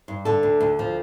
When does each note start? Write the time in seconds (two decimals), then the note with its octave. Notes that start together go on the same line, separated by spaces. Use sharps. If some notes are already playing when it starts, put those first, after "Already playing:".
0.08 G2
0.25 D3 A4
0.43 D2
0.60 D2
0.79 F3